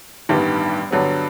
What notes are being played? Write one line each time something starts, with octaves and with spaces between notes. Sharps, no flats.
A1 G2 D#3 G3 B3
G2 D3 F#3 B3